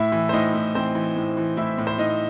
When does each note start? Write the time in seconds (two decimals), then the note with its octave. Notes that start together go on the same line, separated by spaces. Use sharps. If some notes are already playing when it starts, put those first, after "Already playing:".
Already playing: A2 E4 E5
0.12 E3
0.29 C5
0.33 A2 D#4 D#5
0.54 A2
0.75 E3 C4 C5
0.95 E3
1.16 A2
1.37 E3
1.57 A2 E4 E5
1.78 A2
1.87 C5
1.98 A2 D#4 D#5